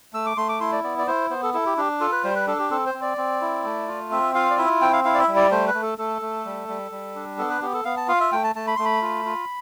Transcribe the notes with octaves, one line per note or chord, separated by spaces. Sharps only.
A3 E6
D6
A3 C6
D6
E4 C6
D5
B3 D5
D5
E4 C5
B3 C5
A4
E4 A4
G4
D4 G4
F4 A4
B4
G3 C5
B4
D4 A4
G4
C4 A4
C5
C4
D5
C4
E4
A3
F4
C4 E5
F4 F5
D5
E4 E5
C4 G5
F5
E4 F5
D5
E5
G3
D5
A3 C5
B4
A3
A4
A3 A4
A3
G3
G3
G3
D4
B3 A4
B4
B3 G4
A4
B3 F5
A5
F4 F5
E5
A3 G5
A5
A3 A5
B5
A3 C6
B5
F4
F4